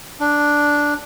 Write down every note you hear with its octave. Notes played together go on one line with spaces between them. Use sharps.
D4